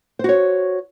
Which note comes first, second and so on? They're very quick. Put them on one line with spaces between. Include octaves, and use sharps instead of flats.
C5 F#4 C#5